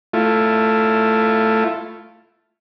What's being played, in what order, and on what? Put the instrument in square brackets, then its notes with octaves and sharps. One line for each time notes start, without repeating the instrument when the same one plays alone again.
[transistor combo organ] A3 E4 F4